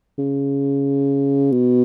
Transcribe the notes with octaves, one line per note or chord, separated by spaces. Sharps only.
C#3
B2